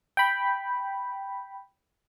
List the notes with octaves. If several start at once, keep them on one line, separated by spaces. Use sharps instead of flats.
G5 B5